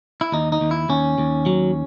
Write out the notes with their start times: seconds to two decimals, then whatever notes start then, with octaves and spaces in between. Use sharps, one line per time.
0.21 E4
0.32 D#2 D#4
0.52 D#4
0.61 D#2
0.71 E4
0.89 D#2 C#4
1.18 D#2
1.46 F#3